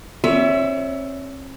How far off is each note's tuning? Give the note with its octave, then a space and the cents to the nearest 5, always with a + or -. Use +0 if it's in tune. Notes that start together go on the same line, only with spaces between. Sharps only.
C4 +45 C#5 +35 E5 +0